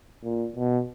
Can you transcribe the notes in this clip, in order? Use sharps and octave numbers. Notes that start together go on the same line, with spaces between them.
A#2
B2